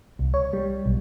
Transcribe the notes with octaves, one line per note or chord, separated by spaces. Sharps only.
C2
C#5
G3
B1